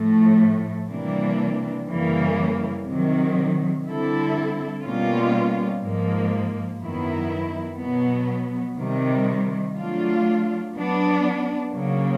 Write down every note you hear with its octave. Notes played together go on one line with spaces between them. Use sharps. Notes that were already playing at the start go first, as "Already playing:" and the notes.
Already playing: A2 F3 A3
C3 E3 G3 A#3 D4
F#2 C#3 E3 G3 A#3
C3 D#3 F#3
D3 G3 C4 E4 A4
B2 G3 A#3 C#4 F4
G#2 F3 A#3
F#2 D#3 F#3 B3 E4
B2 F#3 B3
C3 D#3 G3
F#3 A3 D4 F4
F#3 B3 D4
C#3 F#3 A#3